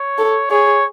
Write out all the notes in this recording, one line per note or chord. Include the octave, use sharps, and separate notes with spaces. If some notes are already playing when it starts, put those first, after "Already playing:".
Already playing: C#5
A4
G#4 C#5